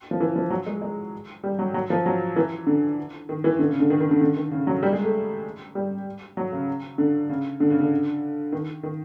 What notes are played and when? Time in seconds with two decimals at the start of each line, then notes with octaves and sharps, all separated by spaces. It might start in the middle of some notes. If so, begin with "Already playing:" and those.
0.11 F3
0.20 E3
0.36 F3
0.50 F#3
0.66 G#3
0.82 G#3
1.44 G3
1.59 F#3
1.74 F#3
1.90 F3
2.06 F#3
2.36 E3
2.67 D3
3.29 D#3
3.44 E3
3.59 D3
3.69 C#3
3.80 D3
3.90 D#3
4.00 D#3
4.11 D3
4.21 D3
4.37 D#3
4.51 C#3
4.67 F#3
4.83 G3
4.93 G#3
5.03 A3
5.75 G3
6.37 F#3
6.52 C#3
6.98 D3
7.29 C#3
7.60 D3
7.70 C#3
7.81 D3
8.52 D#3
8.83 D#3